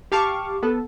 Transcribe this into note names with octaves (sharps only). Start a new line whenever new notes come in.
G4 F5 A5 C#6 D6
B3 A4